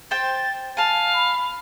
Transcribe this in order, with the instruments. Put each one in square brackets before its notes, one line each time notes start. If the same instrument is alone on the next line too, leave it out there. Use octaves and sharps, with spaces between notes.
[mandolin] C5 G5 [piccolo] A6
[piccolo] F5 [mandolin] G#5 A5
[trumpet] B5